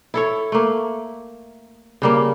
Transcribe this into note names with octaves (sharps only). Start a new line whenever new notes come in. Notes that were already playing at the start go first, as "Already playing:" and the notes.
E4 A4 C#5
A3 A#3
C#3 G3 A#3